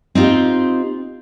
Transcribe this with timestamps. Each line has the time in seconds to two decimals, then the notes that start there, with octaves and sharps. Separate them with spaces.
0.15 C4 D#4 F4 G4